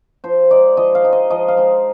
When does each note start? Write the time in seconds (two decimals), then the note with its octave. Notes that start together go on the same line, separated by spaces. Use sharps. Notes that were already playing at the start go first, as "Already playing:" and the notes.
0.24 F3 C5
0.51 G#3 D#4 D5
0.77 F3 D#5
0.95 F5
1.04 G#3 D#4
1.13 D#5
1.30 F3 D#5
1.48 F5
1.57 G#3 D#4